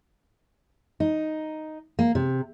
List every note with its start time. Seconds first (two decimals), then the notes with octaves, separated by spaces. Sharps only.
1.00 D#4
1.99 A#3
2.15 C3